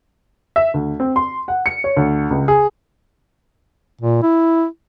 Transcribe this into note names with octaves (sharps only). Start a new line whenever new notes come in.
E5
D2
C4
C6
F#5
C#7
C#5
D2
C#2
G#4
A#2
E4